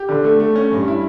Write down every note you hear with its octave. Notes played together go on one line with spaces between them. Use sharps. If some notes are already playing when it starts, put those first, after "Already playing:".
Already playing: G4
D3
A3
A3
C#4
G2
E4